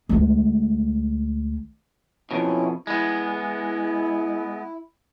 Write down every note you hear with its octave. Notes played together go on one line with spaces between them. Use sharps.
D2 G#3
F2 B2 F#3 C#4 E4
G#3 B3 E4